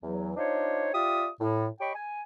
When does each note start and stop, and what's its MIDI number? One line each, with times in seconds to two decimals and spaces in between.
0.02 0.32 40
0.02 0.32 54
0.37 0.89 62
0.37 0.89 63
0.37 0.89 65
0.37 0.89 72
0.37 0.89 73
0.94 1.28 65
0.94 1.28 67
0.94 1.28 74
0.94 1.28 76
0.94 1.28 87
1.40 1.67 45
1.80 1.92 67
1.80 1.92 73
1.80 1.92 75
1.80 1.92 79
1.80 1.92 83
1.80 1.92 85
1.95 2.22 80